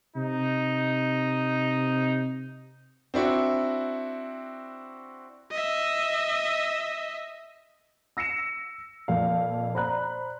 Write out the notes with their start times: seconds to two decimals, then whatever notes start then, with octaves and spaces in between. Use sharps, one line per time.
0.16 C3 D#4
3.14 C4 D4 E4 F#4
5.51 D#5 E5
8.17 E6 A#6 C7 C#7 E7
9.08 F2 A#2 F5
9.75 C5 D5 A#5 B5 F#6